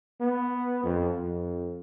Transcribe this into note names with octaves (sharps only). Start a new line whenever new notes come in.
B3
F2
F2